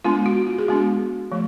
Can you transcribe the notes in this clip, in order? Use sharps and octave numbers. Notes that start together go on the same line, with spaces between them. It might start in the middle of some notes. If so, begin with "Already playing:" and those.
G#3 B3 D4 F4
F#4
F4
G#4
G#3 B3 D4 F#4
F3 A3